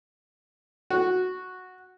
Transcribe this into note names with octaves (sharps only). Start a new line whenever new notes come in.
F#4